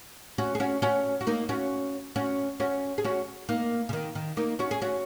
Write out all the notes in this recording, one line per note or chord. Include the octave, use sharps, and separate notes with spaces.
C#4 F#4
G#4
C#4 F#4
C#4 F#4
F#4
A#3 D#4
C#4 F#4
C#4 F#4
C#4 F#4
G#4
C#4 F#4
A#3 D#4
C#3
D#3
D#3
A#3 D#4
C#4 F#4
G#4
C#4 F#4